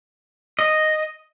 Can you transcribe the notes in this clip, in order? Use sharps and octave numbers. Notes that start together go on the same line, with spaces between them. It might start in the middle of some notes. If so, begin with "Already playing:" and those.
D#5